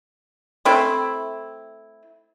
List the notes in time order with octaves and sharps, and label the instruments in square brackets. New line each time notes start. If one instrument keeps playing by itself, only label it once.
[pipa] A3 C4 E4